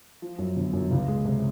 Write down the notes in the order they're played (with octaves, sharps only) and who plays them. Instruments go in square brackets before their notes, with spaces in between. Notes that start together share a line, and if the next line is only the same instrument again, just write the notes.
[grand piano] F3
F#2
G1
F#2
C#2
G#3
C3